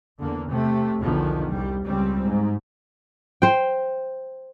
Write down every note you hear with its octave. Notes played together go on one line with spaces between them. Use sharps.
E2 D3 A#3
C3 A3
B1 E2 D3 D#3 F3 B3
C2 G3
C#2 G3 C4
G#2
C5 G5